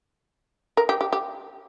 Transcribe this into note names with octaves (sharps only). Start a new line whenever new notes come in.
A#4
G4
G4
G4